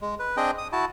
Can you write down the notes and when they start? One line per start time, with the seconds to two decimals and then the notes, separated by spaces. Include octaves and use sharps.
0.01 G#3
0.19 B4
0.37 C4 D4 G#4 D#5 G5
0.58 D#6
0.72 E4 F#4 A5